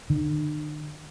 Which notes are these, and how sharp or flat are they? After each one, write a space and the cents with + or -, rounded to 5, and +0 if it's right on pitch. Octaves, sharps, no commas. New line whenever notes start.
D3 +45